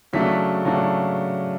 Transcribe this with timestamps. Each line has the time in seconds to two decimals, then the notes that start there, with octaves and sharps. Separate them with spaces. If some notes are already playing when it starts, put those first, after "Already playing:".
0.13 C#3 F#3 A3 D4 B6
0.65 C#3 F#3 A3 D4